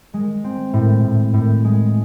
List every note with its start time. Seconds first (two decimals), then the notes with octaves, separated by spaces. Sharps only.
0.14 G#3
0.44 C4
0.73 A2
1.04 A2
1.34 A2
1.64 G#3